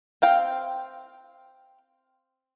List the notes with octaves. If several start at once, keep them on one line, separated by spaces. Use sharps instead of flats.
C4 F5 G5